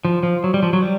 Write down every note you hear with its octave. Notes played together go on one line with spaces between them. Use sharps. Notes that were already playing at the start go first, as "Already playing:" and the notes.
F3
F3
F#3
G3
F3
F#3
G3